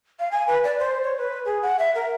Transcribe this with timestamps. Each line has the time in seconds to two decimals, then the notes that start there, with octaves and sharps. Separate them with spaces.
0.20 F5
0.31 G#5
0.47 B4
0.64 D5
0.79 C5
1.04 C#5
1.17 B4
1.45 G#4
1.62 F#5
1.79 E5
1.95 A#4